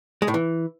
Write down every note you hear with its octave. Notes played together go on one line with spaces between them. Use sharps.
G#3
A2
E3